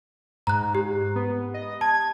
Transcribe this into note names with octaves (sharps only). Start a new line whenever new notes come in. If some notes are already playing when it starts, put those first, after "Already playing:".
G#2 A#5 F#6
G4
B3
D#5
A5 G#6